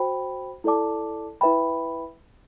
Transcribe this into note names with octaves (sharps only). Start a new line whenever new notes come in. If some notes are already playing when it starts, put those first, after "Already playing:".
Already playing: F#4 C5 G5 B5
E4 A4 D5 A5 D6
E4 B4 E5 G5 B5